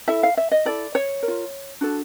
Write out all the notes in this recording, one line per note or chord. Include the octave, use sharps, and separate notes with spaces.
E4 A4 E5
F5
E5
D#5
E4 A4 D5
C#5
A#4
F4
D4 F#4 A4